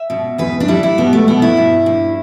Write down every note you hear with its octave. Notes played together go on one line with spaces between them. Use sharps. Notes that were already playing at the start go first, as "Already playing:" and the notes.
Already playing: E5
B2
E2 B4
D4
G3 E4
E4
B2 B3
A3
B2 B3
E4
G2
G2